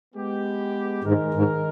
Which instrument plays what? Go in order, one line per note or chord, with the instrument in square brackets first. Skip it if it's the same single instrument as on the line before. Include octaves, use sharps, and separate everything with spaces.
[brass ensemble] G#3 B3 G4
[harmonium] G#2 [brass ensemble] D#3 G#3 D#4 A#4
[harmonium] G#2